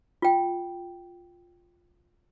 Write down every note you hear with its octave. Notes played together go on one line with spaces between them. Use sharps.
F4 G5